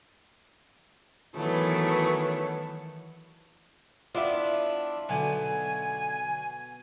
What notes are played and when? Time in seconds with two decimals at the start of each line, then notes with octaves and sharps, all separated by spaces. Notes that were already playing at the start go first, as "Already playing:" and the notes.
1.36 D#3 E3 F#3 A3 B3
4.15 B3 D4 E4 F4 G4 E5
5.09 B1 B2 D3 G#5